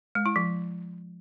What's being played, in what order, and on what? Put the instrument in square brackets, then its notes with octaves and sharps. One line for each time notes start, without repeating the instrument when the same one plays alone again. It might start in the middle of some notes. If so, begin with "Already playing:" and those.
[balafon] G#3
E4
F3